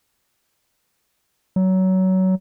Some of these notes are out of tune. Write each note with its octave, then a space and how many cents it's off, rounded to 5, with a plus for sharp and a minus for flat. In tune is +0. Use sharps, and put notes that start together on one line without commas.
F#3 +20